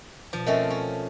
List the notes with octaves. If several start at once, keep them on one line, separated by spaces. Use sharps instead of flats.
B2 F3
A3 C4 C#4 A#4 D#5 E5
C#4